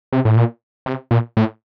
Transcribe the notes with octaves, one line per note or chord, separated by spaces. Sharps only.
C3
A2
A#2
C3
A#2
A2